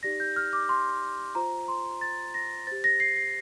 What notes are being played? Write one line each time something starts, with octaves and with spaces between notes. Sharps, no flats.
D#4 G4 D5 A#6
G6
F6
D6
C6
F4 C5 A#5
C6
A6
A#6
G4 C5 A6
A#6
C7
C7